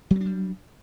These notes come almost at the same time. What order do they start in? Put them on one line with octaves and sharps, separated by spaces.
F#3 C4 D4 G3